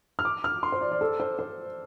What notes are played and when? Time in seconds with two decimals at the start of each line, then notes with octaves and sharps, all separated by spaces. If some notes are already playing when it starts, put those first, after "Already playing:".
0.19 F6
0.25 D6
0.44 F6
0.63 C6
0.72 C5
0.81 D5
0.92 D5
1.01 A4
1.20 C5
1.39 C5